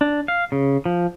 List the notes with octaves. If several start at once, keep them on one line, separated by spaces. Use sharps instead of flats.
D4
F5
C#3
F3